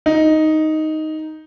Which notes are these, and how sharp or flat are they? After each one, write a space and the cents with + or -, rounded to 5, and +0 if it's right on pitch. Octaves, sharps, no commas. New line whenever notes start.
D#4 +5